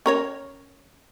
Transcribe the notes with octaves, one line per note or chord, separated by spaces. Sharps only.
C#4 A#4 C#5